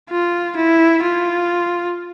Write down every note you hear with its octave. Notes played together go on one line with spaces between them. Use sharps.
F4
E4
F4